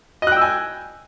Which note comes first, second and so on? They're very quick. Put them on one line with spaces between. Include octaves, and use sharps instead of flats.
D#5 F#6 G5 E6 G#5